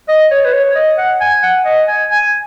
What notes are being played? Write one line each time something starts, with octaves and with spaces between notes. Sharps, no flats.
D#5
C#5
B4
C#5
D#5
F#5
G#5
F#5
D#5
G#5
G#5